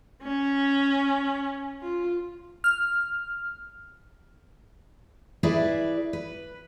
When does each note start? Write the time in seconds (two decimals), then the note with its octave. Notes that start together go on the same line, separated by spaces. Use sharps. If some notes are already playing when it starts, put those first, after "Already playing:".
0.23 C#4
1.82 F4
2.64 F6
5.43 E4 G#4 B4 D5 E5
6.13 B4